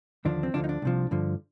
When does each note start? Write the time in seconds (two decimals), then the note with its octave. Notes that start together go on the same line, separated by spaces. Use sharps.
0.25 D#2 D3 F3 D4
0.43 C4
0.54 D2 D3 F3 D4
0.64 D#4
0.69 D4
0.82 C2 C3 F3
1.11 G2 D3 F3